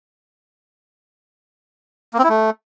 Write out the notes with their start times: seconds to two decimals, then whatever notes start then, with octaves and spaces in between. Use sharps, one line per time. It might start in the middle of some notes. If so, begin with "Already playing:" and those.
2.14 A#3
2.19 C4
2.24 E4
2.29 A3